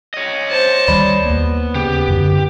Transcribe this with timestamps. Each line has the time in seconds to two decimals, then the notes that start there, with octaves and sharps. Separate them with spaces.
0.14 C#5 D#5
0.50 C5 A5
0.88 D2 D#3 G3 D5 B5
1.25 D#2 A#3 B3
1.75 C#3 G4
2.08 F#2 D3